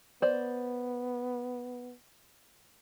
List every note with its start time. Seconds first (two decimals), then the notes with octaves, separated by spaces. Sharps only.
0.22 B3 C5 D5